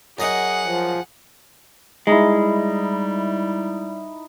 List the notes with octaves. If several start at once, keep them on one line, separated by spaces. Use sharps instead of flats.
F#2 G#4 D#5 F#5 D#6
F3
G3 G#3 D#4 E4